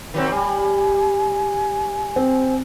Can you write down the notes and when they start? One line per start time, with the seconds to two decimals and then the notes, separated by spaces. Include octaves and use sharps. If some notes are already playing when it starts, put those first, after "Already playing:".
0.14 D#3 F#3 C4
0.32 G3 G#5
2.16 C4